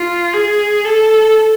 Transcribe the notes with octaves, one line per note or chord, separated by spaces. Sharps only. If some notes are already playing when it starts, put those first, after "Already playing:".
Already playing: F4
G#4
A4